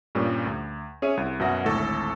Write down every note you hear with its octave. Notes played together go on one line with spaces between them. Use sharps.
G2 A#2 G3 C#4
D2
C#4 G#4 C#5 E5 D#7
C2
F#2 B2 E5 F#5 A#6
G#1 D2 A2 A4 C#6